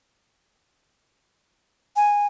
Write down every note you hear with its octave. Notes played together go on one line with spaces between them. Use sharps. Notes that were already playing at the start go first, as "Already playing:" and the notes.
G#5